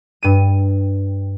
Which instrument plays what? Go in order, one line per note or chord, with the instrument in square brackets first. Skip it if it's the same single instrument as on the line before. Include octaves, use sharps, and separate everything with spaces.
[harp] G2 D#7